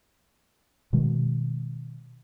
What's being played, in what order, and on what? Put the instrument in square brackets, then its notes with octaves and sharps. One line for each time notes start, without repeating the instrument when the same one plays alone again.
[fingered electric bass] B2 D#3 G#3